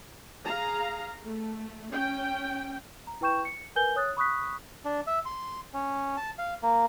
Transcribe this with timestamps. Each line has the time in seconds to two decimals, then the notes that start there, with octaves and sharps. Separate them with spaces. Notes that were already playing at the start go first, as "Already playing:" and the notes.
0.45 G#4 F5 A#5
1.25 A3
1.93 C#4 G5
3.07 A#5
3.21 E4 B4 G5 C#6 G6 E7
3.45 C#7
3.76 A#4 B4 G#5 G6 G7
3.96 C#5 D#6 F#6 A6
4.17 B5 C#6 D#6 F#6 B6
4.85 D4
5.07 E5
5.26 C6
5.74 C#4
6.17 A5
6.38 F5
6.63 A#3